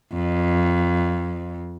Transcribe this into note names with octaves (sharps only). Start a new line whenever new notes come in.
F2